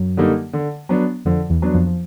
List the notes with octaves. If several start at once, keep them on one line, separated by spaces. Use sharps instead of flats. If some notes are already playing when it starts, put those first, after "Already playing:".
Already playing: F#2 F#3
D3 G3 A#3 D#4
D3
F#3 B3 D4
F2 D3 F3
E2 E3
F#3 B3 D4
F2 F3
F3